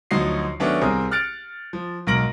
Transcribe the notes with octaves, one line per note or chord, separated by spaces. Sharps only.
D2 F3 F#3 D#4 F#4 C7
D#3 F#3 A3 B3 C#4 D4
C2 C4 G#4 A#4 D#6
F6 F#6 A6 C#7 D7
F3
B1 G#2 A#4 A#6 D7 F#7